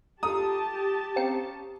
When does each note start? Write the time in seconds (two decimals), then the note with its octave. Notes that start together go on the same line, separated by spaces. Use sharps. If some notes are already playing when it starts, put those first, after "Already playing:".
0.23 F4 G4 A4 A5 A#5 D#6
1.16 C4 C#4 F5 A#5 C#7